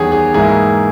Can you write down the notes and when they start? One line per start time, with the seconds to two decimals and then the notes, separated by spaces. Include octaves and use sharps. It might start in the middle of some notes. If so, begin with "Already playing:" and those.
Already playing: E2 D#3 G3 G4 G#4 C#5
0.12 G#4
0.34 G#2 E3 A#3 E4 G#4